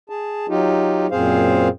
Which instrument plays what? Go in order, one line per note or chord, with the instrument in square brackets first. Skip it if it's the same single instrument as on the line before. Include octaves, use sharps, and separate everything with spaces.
[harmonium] G#4 A5
F#3 D#4 F4 G4
F#2 A#2 C4 G#4 C5 F5